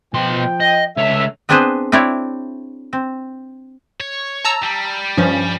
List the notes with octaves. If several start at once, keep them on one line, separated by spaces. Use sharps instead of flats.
B2 F3 G5 C6
D#5
C#2 A4 C#5 E5
B3 C4 D4 G#4 B4 C5
C4 D4 E4 C#5 D5
C4
C#5
A5 A#5 E6
G3
G2 F3 C#4